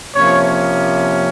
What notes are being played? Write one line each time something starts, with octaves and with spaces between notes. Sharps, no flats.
C3 F3 A#3 C#4 C#5